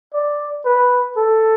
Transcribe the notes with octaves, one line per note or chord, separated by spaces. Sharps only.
D5
B4
A4